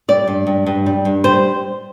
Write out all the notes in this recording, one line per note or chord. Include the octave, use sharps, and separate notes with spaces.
G3 D5
G2
G2
G2
G3
G2
G3 C5